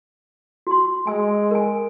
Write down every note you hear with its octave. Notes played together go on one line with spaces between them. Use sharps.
F#4 C6
G#3 G#5 E6
A#4 G#5